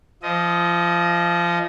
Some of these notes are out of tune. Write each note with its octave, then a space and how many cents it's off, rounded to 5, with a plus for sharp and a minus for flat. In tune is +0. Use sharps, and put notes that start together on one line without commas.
F3 -20 D#5 +10